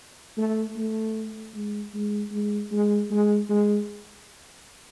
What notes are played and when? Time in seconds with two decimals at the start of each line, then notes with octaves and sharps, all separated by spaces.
0.38 A3
0.77 A3
1.54 G#3
1.94 G#3
2.32 G#3
2.71 G#3
3.11 G#3
3.49 G#3